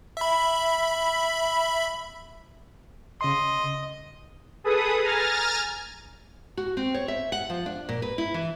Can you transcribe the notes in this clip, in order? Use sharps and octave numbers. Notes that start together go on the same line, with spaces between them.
E5 B5
C#3 D#5 C6
G#4 A4 B4 D#6
G#5 A#5 F6 A6
F#4
C4
C#5
E5
F#5
F3
D4
A#2
B4
E4
E3